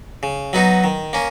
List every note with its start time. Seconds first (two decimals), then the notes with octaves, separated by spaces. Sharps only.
0.23 C#3
0.53 F#3 B3 D#4 F#4
0.84 D#3
1.13 A#3 C#4